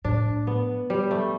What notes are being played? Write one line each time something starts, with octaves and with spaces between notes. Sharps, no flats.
A2 D4
B3
G3
A3